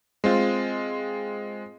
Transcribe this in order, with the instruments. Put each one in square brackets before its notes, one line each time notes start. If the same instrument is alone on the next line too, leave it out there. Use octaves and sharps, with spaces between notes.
[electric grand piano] G#3 C4 F4